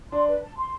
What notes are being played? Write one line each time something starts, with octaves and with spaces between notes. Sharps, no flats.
D4 C6
B4
A5
C6